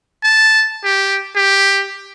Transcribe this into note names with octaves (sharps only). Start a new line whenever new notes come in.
A5
G4
G4